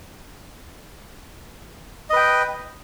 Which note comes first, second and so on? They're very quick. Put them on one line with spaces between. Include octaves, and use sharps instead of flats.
D#5 B4 G5